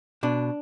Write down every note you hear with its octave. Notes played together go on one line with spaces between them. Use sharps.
B2 D4